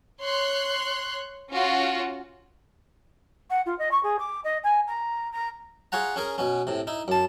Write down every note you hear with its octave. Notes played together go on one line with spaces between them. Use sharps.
C#5 C6 F#6
C#4 F4 F#4
F#5
F4
D#5
C#6
G#4
D6
D#5
G#5
A#5
A#5
F4 G#4 C#5 F#5 A#5
C#4 G#4 A#4
B2 B3 C#4
A2 C3
D#4 E4
F#2 A5